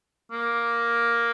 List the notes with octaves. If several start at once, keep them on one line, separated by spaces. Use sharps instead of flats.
A#3